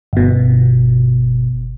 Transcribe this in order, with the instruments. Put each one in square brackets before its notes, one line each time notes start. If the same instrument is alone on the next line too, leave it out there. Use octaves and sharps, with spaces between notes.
[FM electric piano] G1 B2